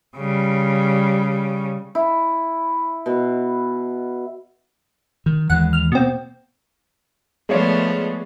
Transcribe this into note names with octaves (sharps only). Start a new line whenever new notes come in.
C#3 G3
E4
B2
D#3
D#2 E3 G#3 F#5
F6
B2 A#3 C4
F3 G#3 A3 B3 C#5 D5